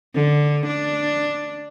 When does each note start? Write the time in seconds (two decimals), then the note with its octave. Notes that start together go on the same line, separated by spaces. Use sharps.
0.15 D3
0.67 D4